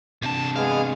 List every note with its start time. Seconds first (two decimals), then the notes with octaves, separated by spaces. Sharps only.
0.22 E2 C3 D4 A5
0.56 G#3 B3 G#4 F5